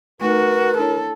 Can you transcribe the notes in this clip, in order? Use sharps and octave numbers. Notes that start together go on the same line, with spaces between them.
A3 D#4 F#4 A#4 B4
D4 E4 A4 C#5